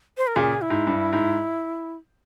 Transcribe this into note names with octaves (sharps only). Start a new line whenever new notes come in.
C5
A#4
A#2 C#3 G#4
E4
G#2
G2
G#2